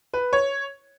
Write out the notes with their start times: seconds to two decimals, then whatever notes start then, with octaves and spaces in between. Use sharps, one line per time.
0.14 B4
0.33 C#5